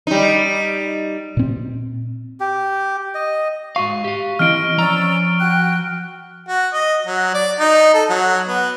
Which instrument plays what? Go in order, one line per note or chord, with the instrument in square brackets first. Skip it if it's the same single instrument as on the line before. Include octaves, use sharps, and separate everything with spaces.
[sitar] G3 D#4
[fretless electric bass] A#2 C4
[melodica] G4
D#5
[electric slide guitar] G#2 F#4 F5 [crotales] C#6
[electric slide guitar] G4 F5
[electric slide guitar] E3 C4 E4 [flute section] D#5 [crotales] F6 D7
[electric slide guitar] F3 A#5 [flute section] C#4 D5 E6
[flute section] F#4 G5 F#6
[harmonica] F#4
D#5
F#3
D5
D#4
A4
F#3
B3